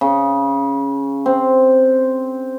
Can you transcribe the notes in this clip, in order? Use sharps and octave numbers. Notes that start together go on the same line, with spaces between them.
C#3
C4